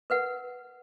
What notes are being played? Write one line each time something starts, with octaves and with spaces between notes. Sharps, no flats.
A#4 B4 F#5